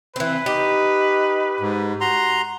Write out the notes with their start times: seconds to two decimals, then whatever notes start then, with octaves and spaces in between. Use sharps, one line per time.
0.16 E3 C4 B4
0.46 D#4 G4
1.60 G#2
2.01 F#4 A#5 C6